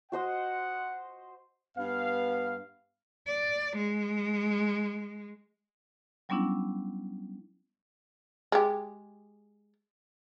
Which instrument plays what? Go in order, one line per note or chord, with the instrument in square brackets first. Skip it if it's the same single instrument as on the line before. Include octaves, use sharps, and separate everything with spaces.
[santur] F#4 C5 D#5 [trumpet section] F#5
[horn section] G2 B3 F5
[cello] D5
G#3
[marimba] F#3 G3 B3 C#4 D4 E4
[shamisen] G#3 G4